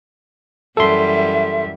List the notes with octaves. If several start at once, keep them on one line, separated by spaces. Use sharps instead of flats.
F#2 E3 G3 A4 E5 C6